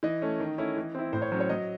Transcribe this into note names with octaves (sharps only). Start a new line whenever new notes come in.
E3 D#5
A3 C#4
D#3
A3 C#4 E4
E3
C4 E4
A2 C5
C#5
F#3 C#4 C5
C#5
F#3 D#5